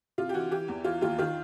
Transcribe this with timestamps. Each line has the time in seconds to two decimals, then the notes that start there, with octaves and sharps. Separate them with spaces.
0.18 C3 F4
0.29 G4
0.34 E3 F#4
0.51 E3 G4
0.68 E2
0.84 E3 F4
1.01 D#2 F4
1.19 D#3 F4